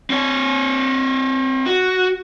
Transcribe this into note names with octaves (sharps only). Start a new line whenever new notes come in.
C4 C#5
F#4